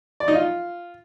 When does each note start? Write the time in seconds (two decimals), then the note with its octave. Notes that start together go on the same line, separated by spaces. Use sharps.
0.20 D5
0.28 D#4
0.35 F4